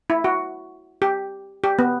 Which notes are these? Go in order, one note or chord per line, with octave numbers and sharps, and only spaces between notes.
E4
F#4
G4
G4
B3